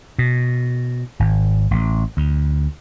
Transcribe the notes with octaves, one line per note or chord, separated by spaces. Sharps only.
B2
G#1
A1
D2